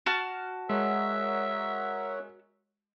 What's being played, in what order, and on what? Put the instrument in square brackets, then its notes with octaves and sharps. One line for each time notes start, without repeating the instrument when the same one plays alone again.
[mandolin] F#4 A5 F6
[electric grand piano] G#3 [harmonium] A#4 C#5 F#5 [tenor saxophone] E5